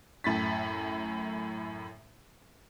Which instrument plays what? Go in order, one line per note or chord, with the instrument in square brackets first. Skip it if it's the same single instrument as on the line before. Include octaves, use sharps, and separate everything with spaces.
[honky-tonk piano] F#2 A2 A6 B6